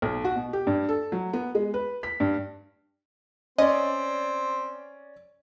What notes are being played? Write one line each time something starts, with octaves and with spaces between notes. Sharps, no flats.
B1
F#4
B2
G4
G2
A4
F#3
B3
G#3
B4
B6
G2
C4 C#4 D5 D#5